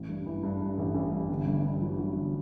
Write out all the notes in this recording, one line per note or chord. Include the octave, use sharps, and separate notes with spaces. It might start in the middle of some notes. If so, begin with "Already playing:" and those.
Already playing: A1
G2
E3
G2
G2
A1
A1
G2
G1
G1
G2
F#3
F#3
G1